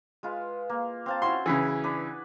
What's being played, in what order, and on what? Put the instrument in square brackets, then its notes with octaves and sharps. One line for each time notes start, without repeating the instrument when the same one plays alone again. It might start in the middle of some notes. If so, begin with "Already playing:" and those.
[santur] G#3 F4 B4
A#3
C4 F5 A5
[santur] C#4 E4 F#4 [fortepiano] C6
[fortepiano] C#3 E3 [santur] G#4 B4 G#5
[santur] D4 B4